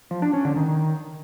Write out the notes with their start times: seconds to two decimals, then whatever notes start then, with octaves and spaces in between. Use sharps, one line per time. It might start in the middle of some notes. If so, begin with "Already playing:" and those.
0.11 F3
0.22 D4
0.33 C#4
0.45 D3
0.56 D#3